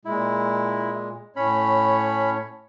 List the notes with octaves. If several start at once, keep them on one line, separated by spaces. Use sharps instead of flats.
A#2 G#3 E4
A2 C#4 C#5 B5